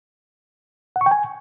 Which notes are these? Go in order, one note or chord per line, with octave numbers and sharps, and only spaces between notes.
F#5
C#6
G5
G#5